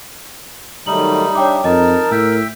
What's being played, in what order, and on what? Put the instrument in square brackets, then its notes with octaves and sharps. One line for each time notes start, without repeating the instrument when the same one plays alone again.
[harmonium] D#3 F#3 A3 [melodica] G3 D#4 [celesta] F#7
[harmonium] D4 E5 [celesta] C#5 G5 D6
[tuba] F2 [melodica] D#4 A5 [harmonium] A#4 [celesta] D#5
[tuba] A2 [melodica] E5 G5 [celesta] E6